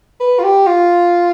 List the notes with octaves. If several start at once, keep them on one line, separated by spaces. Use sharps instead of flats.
B4
F4
G4
F4